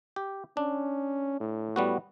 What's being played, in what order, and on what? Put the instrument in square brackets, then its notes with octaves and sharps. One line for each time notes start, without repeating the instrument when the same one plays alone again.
[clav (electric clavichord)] G4
[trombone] C#4 [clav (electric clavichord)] D4
[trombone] A2
[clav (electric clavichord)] G3 B3 F#4